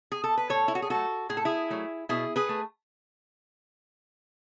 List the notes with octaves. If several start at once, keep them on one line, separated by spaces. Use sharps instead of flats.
G#4
A4
B4
A2 A4 C#5
E4
F#4
G#4
F#3 A3 F#4 A4
A2 G#4
A4
E4 G#4
F#3 A3
B2 E4 G#4
G#4 B4
A3